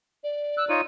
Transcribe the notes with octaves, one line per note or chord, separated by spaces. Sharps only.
D5
E6 F#6
D#4 F4 C#5 D#7